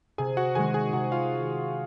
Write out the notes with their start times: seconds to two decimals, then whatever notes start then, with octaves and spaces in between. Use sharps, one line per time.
0.18 C3 G#4 G#5
0.37 F#4 F#5
0.55 D#3 G#3 G#4 G#5
0.74 G#4 G#5
0.93 C3 F#4 F#5
1.12 F4 F5